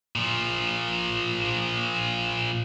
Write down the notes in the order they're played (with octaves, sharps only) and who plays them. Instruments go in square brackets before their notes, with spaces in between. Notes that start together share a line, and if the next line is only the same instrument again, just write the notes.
[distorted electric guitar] A#2 F3